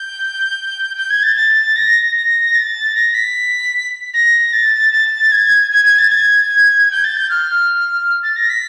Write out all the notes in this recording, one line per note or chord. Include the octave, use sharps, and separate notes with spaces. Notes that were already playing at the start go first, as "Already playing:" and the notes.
Already playing: G6
G6
G#6
A6
A6
A#6
A#6
A6
A#6
B6
A#6
A6
A6
G#6
G#6
G#6
A6
G#6
G6
A6
G6
F6
A6
A#6
B6